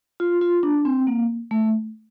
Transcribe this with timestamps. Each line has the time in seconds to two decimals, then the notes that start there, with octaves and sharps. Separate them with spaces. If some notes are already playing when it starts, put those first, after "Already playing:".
0.20 F4
0.41 F4
0.63 D4
0.85 C4
1.07 A#3
1.51 A3